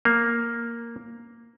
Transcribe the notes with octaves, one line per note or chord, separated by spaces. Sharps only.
A#3